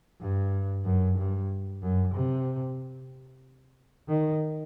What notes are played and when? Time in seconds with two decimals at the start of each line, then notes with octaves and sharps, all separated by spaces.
0.21 G2
0.85 F#2
1.18 G2
1.82 F#2
2.14 C3
4.08 D#3